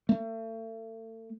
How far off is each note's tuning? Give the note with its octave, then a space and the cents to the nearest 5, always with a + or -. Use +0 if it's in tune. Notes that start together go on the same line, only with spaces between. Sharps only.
A3 +35